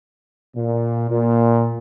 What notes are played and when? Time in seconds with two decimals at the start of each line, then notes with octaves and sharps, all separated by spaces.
0.56 A#2
1.10 A#2